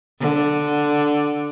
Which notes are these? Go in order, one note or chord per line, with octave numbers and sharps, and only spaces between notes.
D3